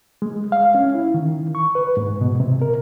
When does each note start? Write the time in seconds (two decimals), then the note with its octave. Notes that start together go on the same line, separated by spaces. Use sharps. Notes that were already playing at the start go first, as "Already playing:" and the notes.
0.22 G#3
0.52 F5
0.75 C#4
0.94 E4
1.14 D#3
1.55 C#6
1.75 B4
1.97 G#2
2.21 B2
2.40 C3
2.62 A#4